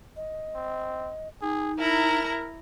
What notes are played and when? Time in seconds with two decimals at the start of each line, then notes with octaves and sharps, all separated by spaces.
0.16 D#5
0.55 C4
1.42 D#4 G#4
1.79 E4 A#4 A#5